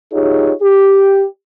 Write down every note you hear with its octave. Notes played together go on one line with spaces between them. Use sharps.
D#4 F4 G4 G#4 C#5
G4